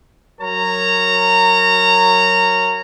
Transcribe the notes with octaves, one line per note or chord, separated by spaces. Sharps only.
F#3 A#4 C#5 A#5